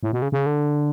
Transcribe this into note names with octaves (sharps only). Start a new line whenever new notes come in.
A2
B2
C#3
C#3
D3